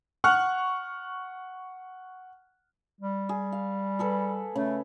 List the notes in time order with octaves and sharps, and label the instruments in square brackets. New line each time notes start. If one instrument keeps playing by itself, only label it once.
[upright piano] F#5 C#6 F6 F#6
[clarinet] G3
[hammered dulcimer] G#4
F5
G#4 A4 B4
[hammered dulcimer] C#3 [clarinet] A3